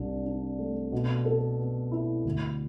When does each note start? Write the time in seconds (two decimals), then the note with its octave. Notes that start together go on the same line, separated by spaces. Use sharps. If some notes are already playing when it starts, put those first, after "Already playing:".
Already playing: C2 D4
0.25 D4
0.59 A3
0.92 B2
1.25 A4
1.59 B3
1.91 E4
2.25 D2